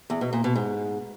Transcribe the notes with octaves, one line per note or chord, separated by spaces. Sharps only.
E2
B2
A#2
B2
G#2